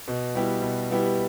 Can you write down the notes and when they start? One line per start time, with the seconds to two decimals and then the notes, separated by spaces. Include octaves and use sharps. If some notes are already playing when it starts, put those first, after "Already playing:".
0.08 B2
0.35 G3 B3 E4 G4
0.62 B2
0.90 G3 B3 E4 G4